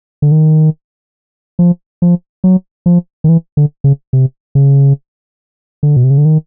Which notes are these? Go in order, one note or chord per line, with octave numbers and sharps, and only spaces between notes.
D3
D#3
F3
F3
F#3
F3
D#3
E3
D3
C#3
C3
C#3
D3
B2
C3
C#3
D3
D#3